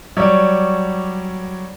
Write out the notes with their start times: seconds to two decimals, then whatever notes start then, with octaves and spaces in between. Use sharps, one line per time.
0.17 F#3 G3 C#5 D5